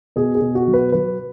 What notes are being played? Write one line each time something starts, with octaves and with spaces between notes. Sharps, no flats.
B2 G#4
G#4
B2
F#4
F#3
B4
F#3 B4